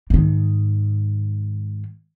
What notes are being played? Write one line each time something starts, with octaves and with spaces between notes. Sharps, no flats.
G#2 D#3